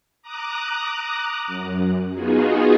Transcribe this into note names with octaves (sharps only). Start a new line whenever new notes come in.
A#5 D6 D#6 F#6
F#2
B3 D#4 F4 F#4 G#4